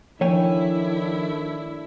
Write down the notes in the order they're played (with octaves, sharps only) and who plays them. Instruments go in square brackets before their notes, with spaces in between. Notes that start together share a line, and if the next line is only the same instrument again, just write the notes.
[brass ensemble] D#3 A3 D4 [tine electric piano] F3 [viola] E4 [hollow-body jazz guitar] C#5 G5 G#5